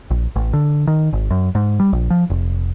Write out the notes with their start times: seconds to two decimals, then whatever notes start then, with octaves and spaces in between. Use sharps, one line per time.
0.11 A#1
0.36 A1
0.53 D3
0.87 D#3
1.13 G#1
1.31 F#2
1.55 G#2
1.80 G3
1.93 A#1
2.10 F3
2.30 F1